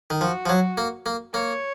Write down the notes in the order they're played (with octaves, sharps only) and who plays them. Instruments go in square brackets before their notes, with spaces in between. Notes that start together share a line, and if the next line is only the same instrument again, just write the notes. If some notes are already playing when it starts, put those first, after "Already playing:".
[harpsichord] D#3
[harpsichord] F3 [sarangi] F#4
[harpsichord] F3
F#3
A#3
A#3
[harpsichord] A#3 [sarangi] C#5